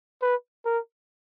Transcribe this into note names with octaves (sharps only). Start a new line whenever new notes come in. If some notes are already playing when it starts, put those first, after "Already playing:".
B4
A#4